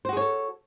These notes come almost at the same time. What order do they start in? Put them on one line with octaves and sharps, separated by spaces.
C5 F#4 G#4 C#5 A4